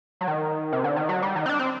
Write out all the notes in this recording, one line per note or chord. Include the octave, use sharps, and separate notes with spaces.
F#3
D#3
C3
D3
D#3
F#3
G3
D#3
C4
D4
C4